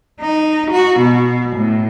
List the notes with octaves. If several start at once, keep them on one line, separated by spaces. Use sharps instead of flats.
D#4
F#4
B2
A2